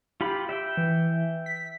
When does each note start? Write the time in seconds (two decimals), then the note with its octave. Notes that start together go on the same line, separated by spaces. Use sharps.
0.21 F4 G4 B5
0.49 E5 G5
0.77 E3
1.46 B6